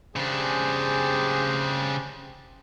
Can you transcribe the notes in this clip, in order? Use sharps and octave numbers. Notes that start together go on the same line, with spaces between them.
C#3 D4 G4 G#4 C5